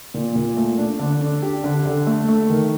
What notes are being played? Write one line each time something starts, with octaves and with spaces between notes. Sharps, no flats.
A#2
A#2
A3
D4
D3
D4
G4
D3
D3
A3
A3
D#3